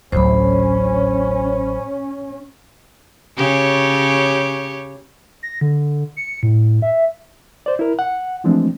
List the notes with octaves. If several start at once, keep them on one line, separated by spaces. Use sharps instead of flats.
A1 D2 F#3 C#4 C5 B5
C#3 G4 C#5
A#6
D3
C#7
A2
E5
C5 D5
E4 A#4
F#5
E3 F3 G#3 A3 C4 D4